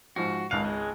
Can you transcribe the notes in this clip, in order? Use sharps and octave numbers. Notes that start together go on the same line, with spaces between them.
G#2 F3 F#4
G#1 C#2 F5 F#6
G#3